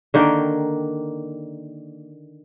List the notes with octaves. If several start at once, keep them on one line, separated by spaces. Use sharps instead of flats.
D3 D#3 A#3 G5